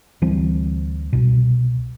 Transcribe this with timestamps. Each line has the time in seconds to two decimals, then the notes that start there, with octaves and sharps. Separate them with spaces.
0.22 D2 E3 G3 C4
1.13 C2 B2